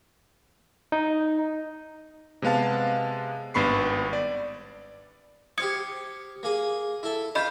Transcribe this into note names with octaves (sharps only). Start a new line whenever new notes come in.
D#4
C3 G#3 B3 F5 A5
G#1 G2 B3 B5 C#6 C7
D5
G4 C5 F5 D#6 G#6 C#7
A#3 G#4
E4 A4
F4 B4 D#5 F5 B5 G6